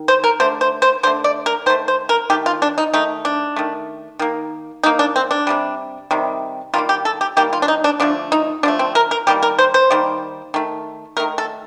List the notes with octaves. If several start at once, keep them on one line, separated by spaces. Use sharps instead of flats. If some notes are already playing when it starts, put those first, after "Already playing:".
Already playing: D#3
C5
A#4
D3 A3 C5
C5
C5
D3 A3 C5
D5
A#4
D#3 A3 C5
C5
A#4
D#3 A3 G4
F4
D4
D#4
D#3 A3 D#4
D4
D#3 A3
D#3 A#3
D#3 A#3 D#4
D4
C4
D4
C3 D#3 G3
C3 D#3 G3
D#3 G3 A#3 F4
G4
A4
G4
D#3 G3 A#3 G4
F4
D4
D#4
D4
D3 F3 A3 D4
D#4
D3 F3 A3 D4
C4
A#4
A#4
D#3 G3 A#3 G4
A#4
C5
C5
D#3 G3 A#3
D#3 A3
D#3 A3 A#4
A4